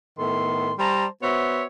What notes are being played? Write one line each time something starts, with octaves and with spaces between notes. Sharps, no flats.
A2 D#3 B3 A4 C6
G3 C5 A5 A#5
B3 F#4 C5 C#5 E5